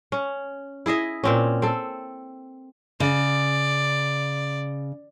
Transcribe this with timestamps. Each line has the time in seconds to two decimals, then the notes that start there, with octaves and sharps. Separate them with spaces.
0.12 C#4
0.86 E4 G#4 D#5 E5
1.24 A#2 C4 C#4
1.62 C4 A4
3.00 C#3 D5